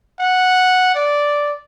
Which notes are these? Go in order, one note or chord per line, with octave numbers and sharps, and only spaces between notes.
F#5
D5